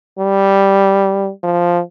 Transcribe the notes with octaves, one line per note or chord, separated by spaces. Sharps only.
G3
F3